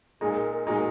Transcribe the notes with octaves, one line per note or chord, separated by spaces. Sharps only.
A#2 G#3 D#4 G#4
A#4
A#4
A#2 G#3 D#4 F#4